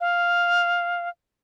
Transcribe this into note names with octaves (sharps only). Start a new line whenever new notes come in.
F5